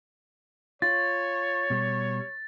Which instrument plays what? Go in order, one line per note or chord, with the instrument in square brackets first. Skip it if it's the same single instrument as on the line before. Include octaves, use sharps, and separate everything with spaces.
[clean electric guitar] F4 [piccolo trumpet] C#5 [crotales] A6
[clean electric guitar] B2 G3